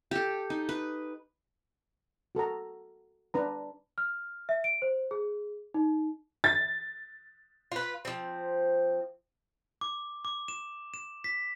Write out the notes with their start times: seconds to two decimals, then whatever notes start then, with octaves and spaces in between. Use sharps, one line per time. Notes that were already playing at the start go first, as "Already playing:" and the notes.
0.11 G4 A4
0.50 D#4
0.69 B4
2.35 F#4 A4 A#4 A#5
3.34 D4 B4 A#5
3.98 F6
4.49 E5
4.64 D7
4.82 C5
5.11 G#4
5.74 D#4
6.44 A6
7.72 F4 B4
8.05 F3 C4
9.81 D6
10.25 D6
10.48 E7
10.94 E7
11.24 B6